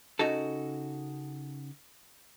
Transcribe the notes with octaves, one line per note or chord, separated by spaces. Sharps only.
C#3 D#4 F#4 A4